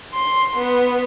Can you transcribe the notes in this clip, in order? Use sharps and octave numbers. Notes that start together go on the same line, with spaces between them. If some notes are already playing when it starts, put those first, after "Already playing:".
C6
B3